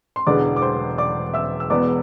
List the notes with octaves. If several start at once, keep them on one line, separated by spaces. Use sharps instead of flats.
C6
E1 E2 D3 G#3 B3 D5 D6
D6
C5 C6
D5 D6
E5 E6
E6
E1 E2 B2 B3 D5 D6